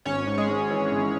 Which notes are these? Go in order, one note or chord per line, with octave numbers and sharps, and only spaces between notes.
G#1 C#4 C#5
G#2
G#3 G#4
G#2
E3
G#1